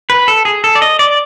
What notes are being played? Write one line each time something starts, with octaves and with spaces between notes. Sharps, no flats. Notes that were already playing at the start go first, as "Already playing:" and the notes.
B4
A4
G#4
A4
D5
D#5
D5